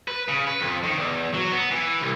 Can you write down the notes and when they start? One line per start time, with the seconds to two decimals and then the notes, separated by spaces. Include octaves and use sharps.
0.08 B4
0.28 C#3
0.47 B4
0.60 F2
0.83 D#3
0.97 E2
1.34 F#3
1.52 B3
1.71 E3
2.01 C2